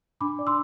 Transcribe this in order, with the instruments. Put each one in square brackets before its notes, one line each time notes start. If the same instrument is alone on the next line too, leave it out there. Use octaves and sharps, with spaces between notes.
[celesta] D4 B5 D6
D5
C6 E6